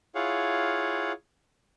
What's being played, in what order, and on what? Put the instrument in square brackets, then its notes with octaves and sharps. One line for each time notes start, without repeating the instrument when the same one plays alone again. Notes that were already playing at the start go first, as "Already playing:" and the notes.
[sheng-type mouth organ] E4 F4 G#4 C#5 F5 F#5